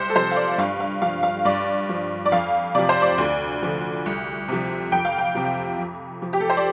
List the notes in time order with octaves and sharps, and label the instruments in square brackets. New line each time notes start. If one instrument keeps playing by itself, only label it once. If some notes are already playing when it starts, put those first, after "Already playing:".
Already playing: [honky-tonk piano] C2 C5
A4
C3 F3 C5
F5
D5
G2 F5
F5
F3 F5
F5
G2 D5
F3
D5
F2 F5
C3 F3 D5
C5
D5
D2
D3 F3
C2
C3 F3
F2 G5
F5
G5
C3 F3
F2
F3
G4
A4
C5
D5